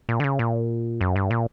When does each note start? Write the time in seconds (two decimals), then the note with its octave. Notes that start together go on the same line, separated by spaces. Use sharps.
0.09 A#2
0.20 D3
0.24 C#3
0.39 A#2
1.01 F#2
1.16 G2
1.31 A#2